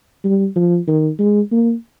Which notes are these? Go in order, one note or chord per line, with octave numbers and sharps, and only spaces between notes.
G3
F3
D#3
G#3
A#3